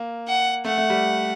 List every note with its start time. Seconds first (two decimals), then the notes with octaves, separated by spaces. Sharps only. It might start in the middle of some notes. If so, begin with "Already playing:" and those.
Already playing: A#3
0.28 F#5
0.65 A3 F#5
0.78 A3
0.90 G3